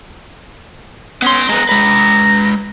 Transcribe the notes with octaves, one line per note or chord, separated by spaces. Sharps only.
B3 C#4 C6
G#3 B3 A#5
G#3 B4 A#5